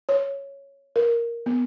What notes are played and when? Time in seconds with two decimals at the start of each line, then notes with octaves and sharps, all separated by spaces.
0.09 C#5
0.96 A#4
1.46 B3